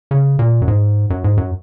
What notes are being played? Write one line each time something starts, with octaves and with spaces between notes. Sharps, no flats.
C#3
A#2
F#2
G#2
F#2
G#2
F#2